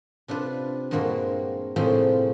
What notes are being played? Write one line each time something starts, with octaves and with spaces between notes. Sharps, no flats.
C3 D4 F4 B4
G2 A#2 G#3 A#3 C4 F#4
A2 C3 F3 G#3 A#3 C4